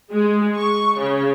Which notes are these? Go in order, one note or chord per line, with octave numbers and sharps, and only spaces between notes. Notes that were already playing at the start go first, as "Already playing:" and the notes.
G#3
C#6
C#3